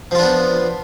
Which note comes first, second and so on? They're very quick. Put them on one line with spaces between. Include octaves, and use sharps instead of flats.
F3 F4 D4 B3